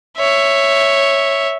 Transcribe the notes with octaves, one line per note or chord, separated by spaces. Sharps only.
C#5 E5